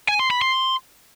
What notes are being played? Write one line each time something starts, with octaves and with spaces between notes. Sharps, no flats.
G#5
C6
B5
C6